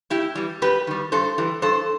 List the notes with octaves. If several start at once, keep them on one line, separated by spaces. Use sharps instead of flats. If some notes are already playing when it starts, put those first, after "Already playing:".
A2 E4 G4
E3 G3
F#2 G4 B4
D#3 G3
G2 A4 C5
E3 G3
G2 A4 C5